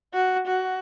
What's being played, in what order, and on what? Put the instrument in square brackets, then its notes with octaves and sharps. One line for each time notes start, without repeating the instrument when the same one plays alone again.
[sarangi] F#4
F#4